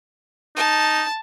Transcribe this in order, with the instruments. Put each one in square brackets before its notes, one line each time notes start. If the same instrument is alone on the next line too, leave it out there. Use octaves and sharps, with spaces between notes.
[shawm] D#4 [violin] A5